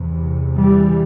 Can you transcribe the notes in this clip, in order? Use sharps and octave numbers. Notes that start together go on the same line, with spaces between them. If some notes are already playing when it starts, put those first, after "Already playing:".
Already playing: E2 C3
E3 G3